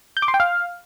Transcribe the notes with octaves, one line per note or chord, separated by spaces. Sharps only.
G6
D6
C6
G5
F5